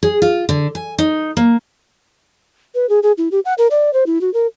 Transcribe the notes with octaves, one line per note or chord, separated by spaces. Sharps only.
G#4
F4
D3
G#5
D#4
A#3
B4
G#4
G#4
E4
G4
F#5
A#4
D5
C5
E4
F#4
A#4